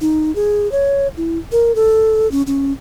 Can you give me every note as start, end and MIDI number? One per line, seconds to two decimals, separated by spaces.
0.01 0.34 63
0.35 0.70 68
0.72 1.08 73
1.17 1.38 64
1.52 1.75 70
1.75 2.30 69
2.31 2.42 61
2.47 2.72 61